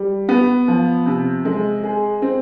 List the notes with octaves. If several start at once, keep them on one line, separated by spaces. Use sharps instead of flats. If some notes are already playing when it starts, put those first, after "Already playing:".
Already playing: G3
B3
F3
C3
G#3
G#4
C4